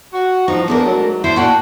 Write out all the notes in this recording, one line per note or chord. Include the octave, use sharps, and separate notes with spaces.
F#4
G2 F3 D#4
E2 A3 D4 A#4
G#2 F#3
D4 E4 C5
A#2 F#4 G5 A5